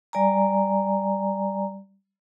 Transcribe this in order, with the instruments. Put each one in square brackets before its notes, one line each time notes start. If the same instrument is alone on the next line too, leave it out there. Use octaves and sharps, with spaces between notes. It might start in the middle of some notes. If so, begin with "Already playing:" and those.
[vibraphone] G3 D5 G#5 A#5